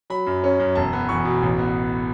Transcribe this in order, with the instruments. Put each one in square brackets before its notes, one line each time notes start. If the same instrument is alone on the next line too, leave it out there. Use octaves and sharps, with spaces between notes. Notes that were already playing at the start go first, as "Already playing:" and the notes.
[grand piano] F#3 B5
F#2
C#4
F#2
E1 A5
B3
E2 C#6
B2
A1
B3